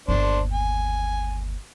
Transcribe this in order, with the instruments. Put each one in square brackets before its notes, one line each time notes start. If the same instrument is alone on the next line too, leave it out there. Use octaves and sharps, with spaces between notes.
[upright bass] G1 D#2 [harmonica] D4 C5
[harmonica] G#5